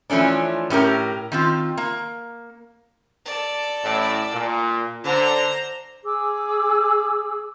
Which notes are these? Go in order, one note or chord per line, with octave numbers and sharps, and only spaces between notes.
E3 F3 A3 C#4 D4
A2 C#4 G4 A#4
D#3 C4 F4
A#3
A4 D5
A1 A2
A#2
D3 C5 A#5
G#4 D6 E6